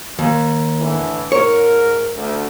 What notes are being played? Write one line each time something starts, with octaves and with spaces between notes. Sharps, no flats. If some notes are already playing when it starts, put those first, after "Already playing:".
D#2
A2 D3 E3
G#2 A#4 C#5
D2